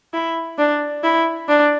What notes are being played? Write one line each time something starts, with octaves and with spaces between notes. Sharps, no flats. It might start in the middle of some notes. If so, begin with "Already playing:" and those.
E4
D4
E4
D4